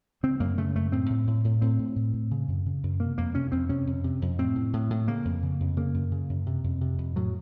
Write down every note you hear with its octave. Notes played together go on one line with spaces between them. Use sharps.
C#3 C4
F#2 A#3
C#3 A3
F#2 A3
A2 C4
A2
A2
A2
A2 C4
A2
A2
A2
C#3
F#2
C#3
F#2
C3 A#3
F2 A#3
C3 C#4
F2 C4
C3 C#4
F2
C3
F2
A2 C4
A2
A2
A2
C#3 A#3
F2
C#3
F2
C#3 A#3
F#2
C#3
F#2
C3
F2
C3
F2
A2 F#3